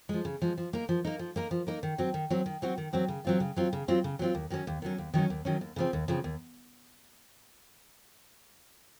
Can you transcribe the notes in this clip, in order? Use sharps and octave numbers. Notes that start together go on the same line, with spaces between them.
F3 G#3
C#3
F3 G#3
F3
A#3 D#4 A#4
F3
A#3 D#4 A#4
F3
A#3 D#4 A#4
F3
A#3 D#4 A#4
D#3
F#3 C4 F#4
D#3
F#3 C4 F#4
D#3
F#3 C4 F#4
D#3
F#3 C4 F#4
C#3
F#3 C4 F4
C#3
F#3 C4 F4
C#3
F#3 C4 F4
C#3
F#3 C4 F4
D#2
D#3 F#3 C#4
D#2
D#3 F#3 C#4
D#2
D#3 F#3 C#4
D#2
D#3 F#3 C#4
D#2
C#3 F3 C4
D#2
C#3 F3 C4
D#2